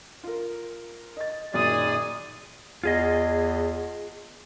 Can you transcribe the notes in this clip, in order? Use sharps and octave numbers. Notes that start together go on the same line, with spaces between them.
F4 A#4
D#5 A6
F#2 A#2 D#3 G#4 D5 D#6
E2 F4 G#4 D#5